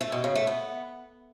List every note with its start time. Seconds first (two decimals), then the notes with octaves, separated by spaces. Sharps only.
0.01 A3
0.12 B2
0.24 C#3
0.35 A3
0.47 B3